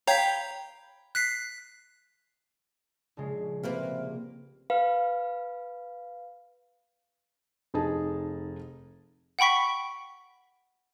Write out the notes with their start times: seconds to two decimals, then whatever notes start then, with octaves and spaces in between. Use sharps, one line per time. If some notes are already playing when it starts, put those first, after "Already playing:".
0.07 C#5 F5 G5 A#5 B5
1.15 F#6 B6 C7
3.17 A#1 C#3 G#3
3.63 C3 A#3 F4 B4
4.70 B4 F5
7.74 F1 D#4 G#4 A5
9.39 F#5 G5 B5 C#6 B6